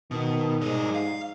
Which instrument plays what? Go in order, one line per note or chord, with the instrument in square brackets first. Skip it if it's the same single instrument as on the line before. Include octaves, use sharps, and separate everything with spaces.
[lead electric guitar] B2 [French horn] D#3
[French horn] G#2 [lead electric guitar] G3 D#5
[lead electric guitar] F5